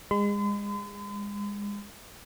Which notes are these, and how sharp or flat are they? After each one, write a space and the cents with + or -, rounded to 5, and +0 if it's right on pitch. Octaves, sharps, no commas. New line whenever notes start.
G#3 -30 C6 -45